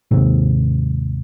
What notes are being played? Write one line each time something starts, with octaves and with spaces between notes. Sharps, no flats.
D#2 G#2 C3